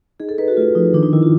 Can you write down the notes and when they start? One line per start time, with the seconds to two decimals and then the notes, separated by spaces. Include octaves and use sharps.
0.20 D#4 G#4
0.29 A4
0.38 D#4 B4
0.48 F#4
0.57 A3 F4
0.75 F3 D#4
0.94 D#3 D4
1.03 D#4
1.13 D#3 E4
1.23 F4